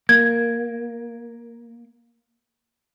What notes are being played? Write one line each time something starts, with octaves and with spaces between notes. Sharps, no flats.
A#3 G#6